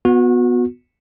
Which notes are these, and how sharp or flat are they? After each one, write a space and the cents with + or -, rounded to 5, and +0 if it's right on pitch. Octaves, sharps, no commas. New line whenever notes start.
B3 +0 F#4 -30